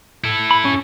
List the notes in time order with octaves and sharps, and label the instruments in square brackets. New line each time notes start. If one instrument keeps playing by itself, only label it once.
[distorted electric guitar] E4 A4
[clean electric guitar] B5
C#4